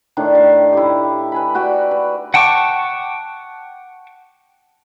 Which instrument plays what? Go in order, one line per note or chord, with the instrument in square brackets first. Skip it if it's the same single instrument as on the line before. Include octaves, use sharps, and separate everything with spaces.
[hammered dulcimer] A2 D#3 D4
F5
E4 G4
B4 G#5 B5
F#4 D5 G5 B5
B4
[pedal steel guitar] F#5 G5 A5 C#6 D6